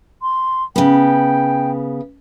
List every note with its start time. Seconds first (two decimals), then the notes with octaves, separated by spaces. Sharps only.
0.22 C6
0.76 C#3 B3 G5